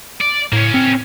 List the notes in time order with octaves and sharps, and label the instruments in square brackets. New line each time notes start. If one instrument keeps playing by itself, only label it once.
[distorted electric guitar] D5
[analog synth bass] A2 [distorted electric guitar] A#3 C#4
[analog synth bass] C4